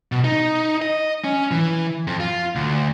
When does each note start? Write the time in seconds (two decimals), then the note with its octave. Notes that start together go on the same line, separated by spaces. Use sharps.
0.12 B2
0.24 D#4
0.82 D#5
1.24 C#4
1.51 E3
2.07 F2
2.20 F4
2.55 D2